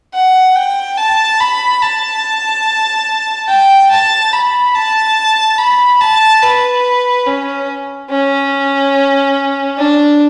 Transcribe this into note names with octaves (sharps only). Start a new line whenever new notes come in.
F#5
G5
A5
B5
A5
G5
A5
B5
A5
B5
A5
B4
C#4
C#4
D4